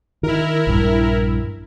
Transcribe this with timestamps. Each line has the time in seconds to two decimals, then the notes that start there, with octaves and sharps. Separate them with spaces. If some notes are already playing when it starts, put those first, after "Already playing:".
0.23 D#3 E4 A#4
0.67 A#1 G2